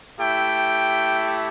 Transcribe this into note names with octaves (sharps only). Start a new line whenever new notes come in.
A3 E4 G4 G5